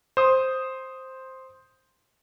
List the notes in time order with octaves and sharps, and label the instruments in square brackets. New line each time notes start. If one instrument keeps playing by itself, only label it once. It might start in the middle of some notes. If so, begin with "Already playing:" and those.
[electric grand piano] C5 D#6